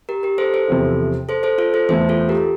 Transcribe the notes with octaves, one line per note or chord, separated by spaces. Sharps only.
G4 A#4
G4 A#4
A4 C5
A4 C5
E2 C3 F3 C4 E4
A4 C5
A4 C5
F4 A4
A4 C5
E2 E3 A3 E4 A4 C5
F4 A4
G4 A#4